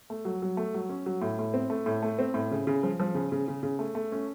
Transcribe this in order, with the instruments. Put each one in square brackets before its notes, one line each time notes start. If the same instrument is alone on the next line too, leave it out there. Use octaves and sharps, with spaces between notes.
[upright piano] A3
F#3
F#3
A3
F#3
C#4
F#3
A2
A2
C4
A3
A2
A3
C4
A2
C#3
C#3
F3
F3
C#3
C#3
C#3
C#3
A3
A3
C#4